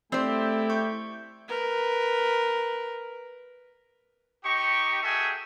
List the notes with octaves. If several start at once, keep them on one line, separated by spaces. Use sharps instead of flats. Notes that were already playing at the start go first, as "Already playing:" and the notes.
A3 C4 E4 G4 C5 D5 G5
C#6 G6
A#4 B4
D#4 G4 C#6
F#4 G#4 A4 E5 G5 G#5